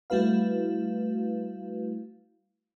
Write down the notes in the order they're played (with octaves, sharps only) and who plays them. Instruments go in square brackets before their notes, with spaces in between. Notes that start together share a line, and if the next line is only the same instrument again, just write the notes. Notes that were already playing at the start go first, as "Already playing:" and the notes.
[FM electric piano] G3 A3 E4 F#4 B4 F5